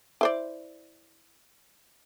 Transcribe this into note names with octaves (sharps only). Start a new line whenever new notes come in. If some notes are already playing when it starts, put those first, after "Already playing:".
E4 C5 D5